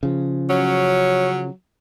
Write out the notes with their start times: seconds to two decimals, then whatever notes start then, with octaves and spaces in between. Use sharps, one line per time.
0.03 C#3 F3
0.50 F#3 C#4